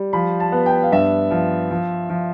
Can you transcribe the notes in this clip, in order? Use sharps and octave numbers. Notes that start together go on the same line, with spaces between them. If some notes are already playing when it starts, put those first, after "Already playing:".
Already playing: G3
F3 B5
A5
B3
G5
F5
G2 E5
F3
F3
F3